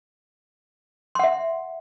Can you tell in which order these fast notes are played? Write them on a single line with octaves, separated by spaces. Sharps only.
C6 F#5 E5